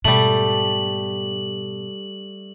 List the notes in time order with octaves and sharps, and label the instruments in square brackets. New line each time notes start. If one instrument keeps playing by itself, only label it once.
[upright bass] G#2 B2 [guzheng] G3 A3 [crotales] F#7